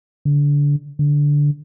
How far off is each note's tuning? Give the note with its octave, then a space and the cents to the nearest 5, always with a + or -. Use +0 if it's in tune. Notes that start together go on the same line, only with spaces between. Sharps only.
D3 -25
D3 -10